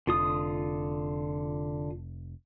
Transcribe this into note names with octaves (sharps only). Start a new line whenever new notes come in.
F1 D3 F4 D#6